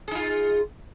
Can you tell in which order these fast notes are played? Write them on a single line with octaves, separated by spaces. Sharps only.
G#4 D#4 F4